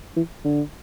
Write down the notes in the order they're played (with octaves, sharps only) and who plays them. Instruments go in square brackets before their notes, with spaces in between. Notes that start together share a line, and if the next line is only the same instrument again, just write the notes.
[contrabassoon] E3
D3